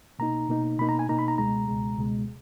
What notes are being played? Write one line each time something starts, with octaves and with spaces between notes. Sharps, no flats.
B2 A#3 D#4 A#5
B2 A#3 D#4
B2 A#3 D#4 B5
A#5
G#5
B2 A#3 D#4 A#5
B5
A#5
C#2 B2 G#3 A#5
C#2 B2 G#3
C#2 B2 G#3